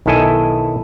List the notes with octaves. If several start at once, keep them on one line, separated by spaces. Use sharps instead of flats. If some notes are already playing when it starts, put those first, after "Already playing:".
B1 D#3 E4 A4 D#5 G#5